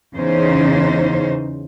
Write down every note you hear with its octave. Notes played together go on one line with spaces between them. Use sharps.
E2 C#3 D#4 C5